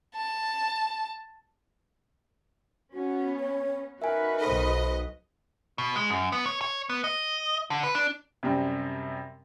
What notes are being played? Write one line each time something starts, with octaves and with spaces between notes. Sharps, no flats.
A5
B3 C#4 F#4
C#5
D#4 F#4 A#4 B4 E5 G#5
B1 A4 C5 D#5
B2
G#3
F#2
B3
C#5
C#5
B3
D#5
D3
B4
D4
F#2 C3 G3 C4